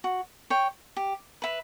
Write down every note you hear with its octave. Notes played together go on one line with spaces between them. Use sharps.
F#4
C#5 G5 C#6
G4
B4 E5 B5